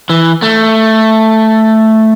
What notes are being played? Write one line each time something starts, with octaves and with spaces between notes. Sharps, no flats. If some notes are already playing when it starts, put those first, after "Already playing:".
E3
A3